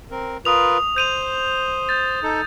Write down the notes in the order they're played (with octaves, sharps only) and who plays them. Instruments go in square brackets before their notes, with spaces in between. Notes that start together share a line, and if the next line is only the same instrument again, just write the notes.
[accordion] C4 A#4
[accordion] F4 A#4 B4 [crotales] D#6 F7
[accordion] C5 [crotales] G6 D#7 F7
[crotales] G6 A6
[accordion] D#4 A4